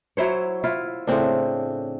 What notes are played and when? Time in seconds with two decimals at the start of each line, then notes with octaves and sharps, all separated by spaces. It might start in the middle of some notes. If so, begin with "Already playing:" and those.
0.17 F#3 E4 C5 C#5
0.64 E4 F4
1.07 A2 C#3 C4 D4